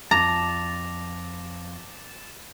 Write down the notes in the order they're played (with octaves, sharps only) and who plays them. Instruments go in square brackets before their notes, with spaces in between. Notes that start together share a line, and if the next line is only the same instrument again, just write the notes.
[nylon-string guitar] F2 [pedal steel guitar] A5 [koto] A#5 [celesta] D6 A#6 F7